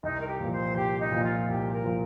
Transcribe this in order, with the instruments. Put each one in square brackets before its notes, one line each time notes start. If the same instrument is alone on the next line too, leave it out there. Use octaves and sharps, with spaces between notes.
[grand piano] C2 [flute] D#4
[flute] A#4
G4
[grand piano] A#2 F3
[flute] C5
[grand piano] C2 [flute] G4
[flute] D#4
[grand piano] A#2 F3
[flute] F4
[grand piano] C2 [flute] G4
[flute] A#4
[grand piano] A#2 F3